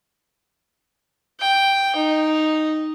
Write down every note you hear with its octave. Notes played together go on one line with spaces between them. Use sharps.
G5
D#4